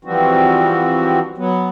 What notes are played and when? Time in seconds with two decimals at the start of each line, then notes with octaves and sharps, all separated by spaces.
0.05 E3 F3 G3 C4 F#4
1.38 F#3 B3